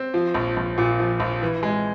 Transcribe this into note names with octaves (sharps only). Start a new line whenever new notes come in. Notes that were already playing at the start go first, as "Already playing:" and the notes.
Already playing: C4
F3
A#1
A#1
A#2
F3
A#1
E3
G#3